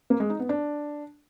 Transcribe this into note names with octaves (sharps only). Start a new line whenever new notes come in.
A#3
G#3
D#4
B3
D4